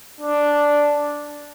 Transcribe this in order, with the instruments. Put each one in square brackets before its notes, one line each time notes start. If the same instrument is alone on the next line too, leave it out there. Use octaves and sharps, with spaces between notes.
[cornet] D4